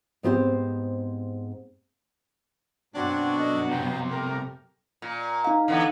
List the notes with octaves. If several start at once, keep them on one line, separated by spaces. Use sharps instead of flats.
G#2 B3 C4 E4 G4 C5
F#2 B2 F#3 C4 D4 F#4 C#5 D5
A4 D5 D#5
C2 C3 G5 A#5
A3 G4 A#4
A#2
D#4 F5
D3 E3 B3